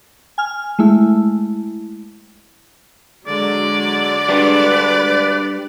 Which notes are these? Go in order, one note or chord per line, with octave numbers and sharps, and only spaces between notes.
G#5 F6
G#3 A3 E4
D3 F#3 G#3 D5
G3 D4 B4